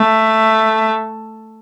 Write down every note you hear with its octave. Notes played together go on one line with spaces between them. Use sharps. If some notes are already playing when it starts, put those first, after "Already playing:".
Already playing: A3